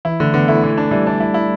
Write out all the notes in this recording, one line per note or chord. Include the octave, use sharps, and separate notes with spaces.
E3 E4
D3 A3
D3 B3
A3 E4
E3
D4
E3 G3
D4
E4
E4